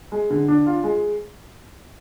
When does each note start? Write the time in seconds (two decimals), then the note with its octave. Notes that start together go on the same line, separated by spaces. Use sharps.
0.12 G#3
0.30 D3
0.48 D4
0.66 F4
0.84 G#3